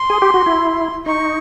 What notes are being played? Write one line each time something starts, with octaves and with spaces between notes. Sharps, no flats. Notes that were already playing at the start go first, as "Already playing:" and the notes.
Already playing: C6
G#4
G4
F#4
E4
D#4 C#6